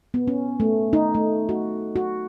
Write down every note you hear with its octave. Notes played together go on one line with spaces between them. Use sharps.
B3
C#4
A3
D#4
A3
F#4
F#4